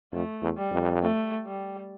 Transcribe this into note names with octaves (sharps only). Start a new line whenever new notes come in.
F2 A3
E2
G3
F2
A3
G3